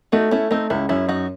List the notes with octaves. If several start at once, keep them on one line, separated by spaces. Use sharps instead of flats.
A3 D#4 F#4
A3 C#4 E4
A3 C4 D#4
C#2 C#4 E4
F#2 C#4 E4
F#2 D#4 F#4